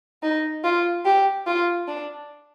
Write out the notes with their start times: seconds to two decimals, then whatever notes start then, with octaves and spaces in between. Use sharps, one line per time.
0.23 D#4
0.64 F4
1.05 G4
1.47 F4
1.88 D4